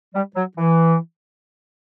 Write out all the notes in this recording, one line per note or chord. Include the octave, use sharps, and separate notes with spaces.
G3
F#3
E3